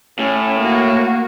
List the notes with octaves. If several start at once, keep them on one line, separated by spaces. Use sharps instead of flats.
A2 C#4
A#3 F#4